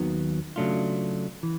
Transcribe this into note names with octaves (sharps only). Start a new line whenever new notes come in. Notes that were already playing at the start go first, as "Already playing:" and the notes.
Already playing: D#2 D#3 F#3 B3
C#3 F#3 A3 D4 F4
E3